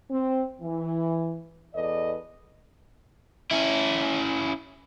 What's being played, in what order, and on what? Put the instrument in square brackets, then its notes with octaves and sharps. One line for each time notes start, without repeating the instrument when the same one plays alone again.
[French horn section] C4
E3
E2 A4 B4 D5 D#5
[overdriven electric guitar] C#4 E4